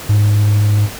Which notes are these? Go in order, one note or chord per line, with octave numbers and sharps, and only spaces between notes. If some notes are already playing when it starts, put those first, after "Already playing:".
G#2